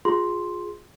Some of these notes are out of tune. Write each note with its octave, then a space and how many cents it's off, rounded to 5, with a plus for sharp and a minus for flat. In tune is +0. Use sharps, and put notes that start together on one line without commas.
F4 +25 G#4 +0 C6 +0